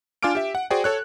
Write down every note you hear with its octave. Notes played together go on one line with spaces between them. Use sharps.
D4 F4 G#5 D6 F6 D7
G4 E5
F#5
F#4 G#4 C5 D5 G5 G#5
A4 C#5 F#6